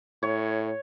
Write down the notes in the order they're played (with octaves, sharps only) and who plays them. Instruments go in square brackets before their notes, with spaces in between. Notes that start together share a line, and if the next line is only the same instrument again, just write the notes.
[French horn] A2 [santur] C#5